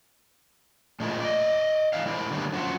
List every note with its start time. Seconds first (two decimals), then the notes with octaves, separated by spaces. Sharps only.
1.00 A#2 F3 G#3 A3 E4 A#4
1.20 D5 D#5
1.93 E3 A#3 D5 F5
2.06 G#3 E4 A#4 C5 D5
2.31 D3 D#3 F#3 G3 A#3 B3
2.53 F#2 D3 F3 F#4 C5